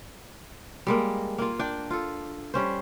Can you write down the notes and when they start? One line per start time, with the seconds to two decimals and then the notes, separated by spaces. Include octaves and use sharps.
0.87 G3 G#3 A#3
1.38 A#3 F4
1.59 D4 D5 G5
1.90 F4 A4
2.54 G3 C#4 C5